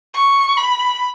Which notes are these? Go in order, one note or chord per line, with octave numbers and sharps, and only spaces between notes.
C#6
B5